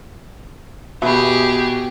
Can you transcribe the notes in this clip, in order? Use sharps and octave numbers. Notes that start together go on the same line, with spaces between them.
B2 G4 G#4 E5 B5